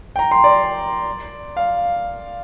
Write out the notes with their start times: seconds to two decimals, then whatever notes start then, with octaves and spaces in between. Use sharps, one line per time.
0.16 G5
0.19 A#5
0.31 C6
0.44 D5
1.57 F5